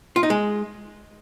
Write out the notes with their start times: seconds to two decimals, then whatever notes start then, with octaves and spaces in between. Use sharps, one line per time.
0.16 F4
0.23 D#4
0.30 G#3